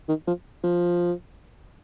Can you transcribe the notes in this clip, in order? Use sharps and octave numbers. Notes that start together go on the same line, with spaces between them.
D#3
F3
F3